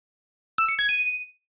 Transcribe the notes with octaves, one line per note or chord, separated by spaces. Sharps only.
E6
C#7
G#6
D#7